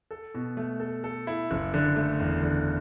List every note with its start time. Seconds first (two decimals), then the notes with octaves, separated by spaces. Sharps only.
0.11 A4
0.34 B2
0.57 A3
0.80 A4
1.04 A4
1.27 E4
1.51 F#1
1.74 D3
1.96 A3
2.20 E2
2.42 D3